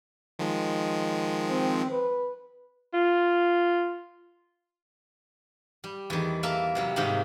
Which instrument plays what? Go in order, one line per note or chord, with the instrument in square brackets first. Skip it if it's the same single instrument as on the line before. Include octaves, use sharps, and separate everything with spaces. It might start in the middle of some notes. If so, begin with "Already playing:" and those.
[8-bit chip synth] D#3 F3 G#3
[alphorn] C4
B4
[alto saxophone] F4
[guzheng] G3
E2 D#3
A#3 A#4 E5 A5
C3 F#3 G3
G#2 C3 D#3 A#3 D#4